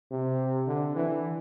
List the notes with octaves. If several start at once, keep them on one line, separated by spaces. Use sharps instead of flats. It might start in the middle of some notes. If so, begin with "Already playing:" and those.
C3
D3
E3